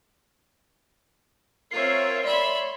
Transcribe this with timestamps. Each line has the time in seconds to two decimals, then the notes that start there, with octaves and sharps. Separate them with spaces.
1.71 C4 F4 A#4 C#5 E5 C7
2.25 C#5 D5 E5 B5 C6